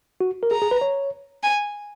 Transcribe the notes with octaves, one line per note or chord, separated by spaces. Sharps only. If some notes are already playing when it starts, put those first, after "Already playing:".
F#4
A#4
G#4 A#5
G#4
B4
C#5
G#5